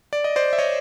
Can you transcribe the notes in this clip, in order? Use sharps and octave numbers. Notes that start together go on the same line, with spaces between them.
D5
D#5
C5 D5
E5
C#5 D#5